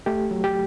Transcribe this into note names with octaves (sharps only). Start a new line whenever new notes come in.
A3 G4
F#3
G4